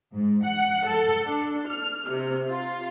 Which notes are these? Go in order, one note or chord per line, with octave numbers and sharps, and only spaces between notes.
G#2
F#5
A4
D4
F6
C3
F4